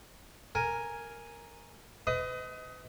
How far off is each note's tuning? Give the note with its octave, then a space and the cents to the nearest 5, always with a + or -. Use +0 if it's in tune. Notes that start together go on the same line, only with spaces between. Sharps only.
A#4 +0 G#5 +0
B4 +40 D#5 +20